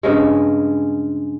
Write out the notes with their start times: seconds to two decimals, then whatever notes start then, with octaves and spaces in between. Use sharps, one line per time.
0.03 G2 C#3 G#3